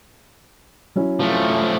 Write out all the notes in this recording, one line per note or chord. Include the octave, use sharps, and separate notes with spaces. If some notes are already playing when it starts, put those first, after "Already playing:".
F#3 C#4 E4
F3 A3